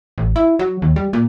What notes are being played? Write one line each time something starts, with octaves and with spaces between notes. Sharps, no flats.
A1
E4
F#3
D#2
G3
A#2